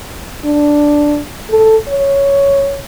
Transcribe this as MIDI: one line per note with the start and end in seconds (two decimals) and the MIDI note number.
0.45 1.20 62
1.51 1.76 69
1.88 2.80 73